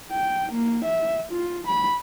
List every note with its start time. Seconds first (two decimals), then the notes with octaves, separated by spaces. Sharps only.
0.12 G5
0.52 A#3
0.85 E5
1.32 F4
1.67 B5